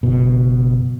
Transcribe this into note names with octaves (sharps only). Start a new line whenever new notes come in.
F#1 B2